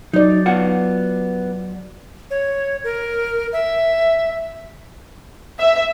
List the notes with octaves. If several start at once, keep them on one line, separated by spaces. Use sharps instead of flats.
F#3 D#4 D5
B3 F4 F#5
C#5
A#4
E5
E5